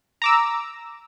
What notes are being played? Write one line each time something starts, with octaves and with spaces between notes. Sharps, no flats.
A#5 D6 E6